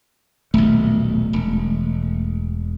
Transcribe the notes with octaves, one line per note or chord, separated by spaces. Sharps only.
D#1 B1 A3
E1